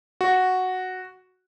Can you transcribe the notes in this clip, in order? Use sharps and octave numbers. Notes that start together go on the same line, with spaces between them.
F#4